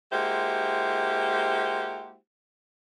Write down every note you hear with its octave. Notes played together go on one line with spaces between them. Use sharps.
G#3 A#3 E4 F#4 G4 C5